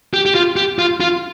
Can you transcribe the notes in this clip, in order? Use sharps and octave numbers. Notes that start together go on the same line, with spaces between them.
G4
G4
F4
G4
F4
F4